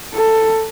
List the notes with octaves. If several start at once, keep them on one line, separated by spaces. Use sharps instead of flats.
A4